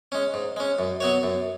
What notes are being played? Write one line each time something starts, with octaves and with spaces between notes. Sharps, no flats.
G#3 C#4
G#2
G#3 C#4
F#2
F#3 B3 F#4 C#5
F#2